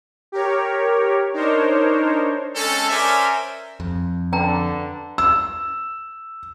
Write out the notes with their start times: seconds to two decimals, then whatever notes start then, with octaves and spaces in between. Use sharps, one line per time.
0.32 G4 A#4 C#5
1.33 D4 D#4 A#4 C5 C#5
2.56 G#3 C4 C#4 A4
2.90 C#4 A#4 C5 D5 E5 G#5
3.80 F2
4.33 D3 B4 G5 A5 A#5
5.18 E6